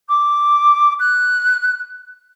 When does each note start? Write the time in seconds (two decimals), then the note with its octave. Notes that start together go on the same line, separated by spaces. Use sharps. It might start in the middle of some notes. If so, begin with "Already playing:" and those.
0.08 D6
0.99 F#6